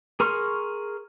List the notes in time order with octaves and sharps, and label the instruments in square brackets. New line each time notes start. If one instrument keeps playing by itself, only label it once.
[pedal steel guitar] G#4 A#4 C6 C#6 F6